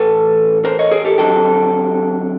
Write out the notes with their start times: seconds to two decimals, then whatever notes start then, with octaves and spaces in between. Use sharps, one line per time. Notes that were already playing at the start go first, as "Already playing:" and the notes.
Already playing: A2 E3 A4 B4
0.65 A#4 C5
0.79 C#5 D#5
0.91 G#4 A#4
1.05 G4 A4
1.18 F2 D3 F#3 G4 A4